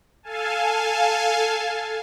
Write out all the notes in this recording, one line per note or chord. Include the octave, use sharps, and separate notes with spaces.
A4 F5 G#5 A5